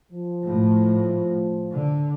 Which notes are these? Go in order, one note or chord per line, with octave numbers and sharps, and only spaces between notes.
F3
A2
D3